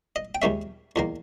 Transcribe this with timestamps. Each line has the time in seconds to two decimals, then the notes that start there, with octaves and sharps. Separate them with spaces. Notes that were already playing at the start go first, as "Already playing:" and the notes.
0.16 D#5
0.35 G5
0.42 D#2 D#3 G#3 C#4 E5
0.96 E2 D#3 A#3